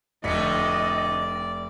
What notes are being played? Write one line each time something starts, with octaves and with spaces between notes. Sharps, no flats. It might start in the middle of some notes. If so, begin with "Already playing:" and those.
F1 A2 D3 D5 D#5 B6 C#7